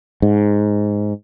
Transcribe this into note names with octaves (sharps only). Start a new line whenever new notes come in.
G#2